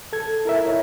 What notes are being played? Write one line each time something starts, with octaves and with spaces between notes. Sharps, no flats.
A4 G#6
E4 A#4 E5
E4 C#5 D#5